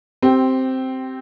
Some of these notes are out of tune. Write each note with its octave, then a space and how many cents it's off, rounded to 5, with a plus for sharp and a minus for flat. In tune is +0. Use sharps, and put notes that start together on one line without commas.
C4 +0 G4 -15